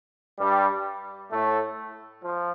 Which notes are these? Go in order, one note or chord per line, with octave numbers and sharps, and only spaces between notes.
G2 G3
A2 A3
F3